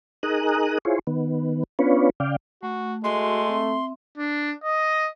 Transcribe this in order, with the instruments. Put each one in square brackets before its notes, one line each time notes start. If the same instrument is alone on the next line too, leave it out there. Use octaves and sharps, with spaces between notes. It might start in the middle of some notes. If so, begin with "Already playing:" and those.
[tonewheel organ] D#4 G#4 A#4 D#6 F#6
E4 F4 G#4 C5 C#5
D#3 B3
B3 C#4 D4 F4 B4 C#5
C#3 D5 F5 G5
[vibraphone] A3 [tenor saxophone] F#4
[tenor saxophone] G#3 [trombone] A3 [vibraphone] F#4 [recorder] C6
[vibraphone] C4 E5
[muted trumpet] D4
D#5